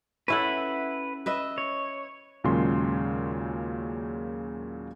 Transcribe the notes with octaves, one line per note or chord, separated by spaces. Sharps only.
C#4 E4 A4 B4 E5 F#5
B4 D#5 E5
C#5
D#2 A#2 C#3 F#3 G#3 C6